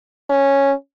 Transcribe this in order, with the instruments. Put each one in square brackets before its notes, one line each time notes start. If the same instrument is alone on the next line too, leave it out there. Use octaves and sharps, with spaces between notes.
[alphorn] C#4